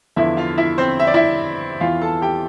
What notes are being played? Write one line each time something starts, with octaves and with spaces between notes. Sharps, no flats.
E2 D3 F3 E4 E5
F4 F5
E4 E5
C4 C5
E5
D5
E4 E5
E2 E3 F4 F5
A4 A5
G4 G5